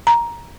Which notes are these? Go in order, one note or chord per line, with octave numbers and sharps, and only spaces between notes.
A#5